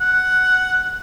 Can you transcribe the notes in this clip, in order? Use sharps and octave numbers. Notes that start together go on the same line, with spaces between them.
F#5